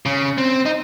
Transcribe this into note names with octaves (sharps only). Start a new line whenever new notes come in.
C#3
C4
D#4